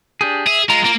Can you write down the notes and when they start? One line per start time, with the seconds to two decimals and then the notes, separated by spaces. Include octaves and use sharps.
0.21 D4 G4 G#4
0.47 G#4 E5
0.70 G#3 F4 A#5
0.85 A#3